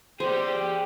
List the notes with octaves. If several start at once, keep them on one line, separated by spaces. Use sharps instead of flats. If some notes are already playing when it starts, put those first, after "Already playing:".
G4 G#4 C5 D5